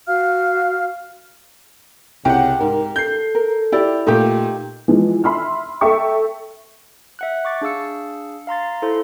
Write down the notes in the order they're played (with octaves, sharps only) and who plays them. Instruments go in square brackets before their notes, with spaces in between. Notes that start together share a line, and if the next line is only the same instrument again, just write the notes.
[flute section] F#4 F5 F6
[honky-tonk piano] C2 F#5 [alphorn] C#3 [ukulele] G4 G5
[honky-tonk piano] G#2 [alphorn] A#4
[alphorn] A4 [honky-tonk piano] G6 C7
[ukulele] A#4
[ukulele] E4 D5 [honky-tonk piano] G4
[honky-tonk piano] A#2 A3 [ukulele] D#4 G4
[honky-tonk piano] E3 F3 G#3
E5 B5 C6 E6 F6
A4 E5 G5 C#6
[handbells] E5 F#5 F#6
C#6 D6 A6
D4 G#4 F5 E6 C#7
F5 A#5 C6 A6
E4 A4 C5 C6